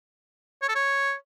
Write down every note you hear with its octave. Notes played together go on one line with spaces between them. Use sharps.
C#5
A4
C#5